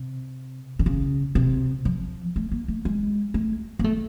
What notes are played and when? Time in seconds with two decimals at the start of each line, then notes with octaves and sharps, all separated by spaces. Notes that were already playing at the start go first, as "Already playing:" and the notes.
Already playing: C3
0.79 D3
0.86 C#3
1.35 C3
1.85 F3
2.36 A3
2.52 A#3
2.68 A3
2.85 G#3
3.34 A3
3.79 A#3
3.84 A3